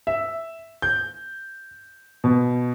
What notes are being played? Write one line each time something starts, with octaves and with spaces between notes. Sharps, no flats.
E5
G6
B2